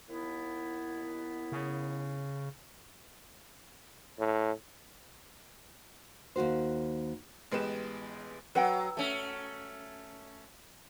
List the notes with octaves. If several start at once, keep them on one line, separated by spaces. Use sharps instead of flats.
D#2 B3 E4
C#3
A2
D#2 G#2 F#4 C5
A1 G#3 B3 G4 B4 E7
F#3 B4 F#5 G5
A3 C#4